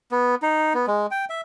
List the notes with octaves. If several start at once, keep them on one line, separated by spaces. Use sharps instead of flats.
B3
D#4
B3
G#3
G5
E5